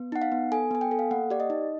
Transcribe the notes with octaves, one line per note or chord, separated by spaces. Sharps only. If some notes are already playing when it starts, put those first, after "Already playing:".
Already playing: B3
D#4 F#5
F5
B3
A4 G#5
B3 G#5
G5
A4
F5
A#3 F#5
G4 D5
D#5
D#4